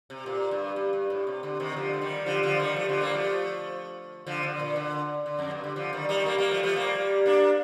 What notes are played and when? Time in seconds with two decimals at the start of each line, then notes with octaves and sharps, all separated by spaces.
0.10 C3
0.26 A#2
0.51 G2
0.76 G2
0.93 G2
1.10 A2
1.27 C3
1.43 D3
1.60 C3 D#3
1.76 D3 F3
1.93 A3
2.01 D#3 G3
2.26 D3 F3
2.43 D3 F3
2.59 D#3 G3
2.76 F3 A3
2.88 D3 F3
3.01 G3 A#3
3.14 F3 A3
4.26 D3 F3
4.43 D3
4.60 A#2
4.76 D3
5.26 D3
5.39 F2
5.51 G2
5.64 D3
5.76 D3 F3
5.93 D#3 G3
6.09 D#3 G3
6.26 G3 A#3
6.38 G3 A#3
6.51 F3 A3
6.63 F3 A3
6.76 G3 A#3
7.26 A#3 D4